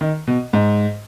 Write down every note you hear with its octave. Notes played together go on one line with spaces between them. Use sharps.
D#3
B2
G#2